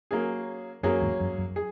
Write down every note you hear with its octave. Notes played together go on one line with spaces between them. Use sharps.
F#3 A#3 C#4 G#4
F#2 F#3 A#3 C#4 G#4
E2 G#2
F#2
F#2
G#4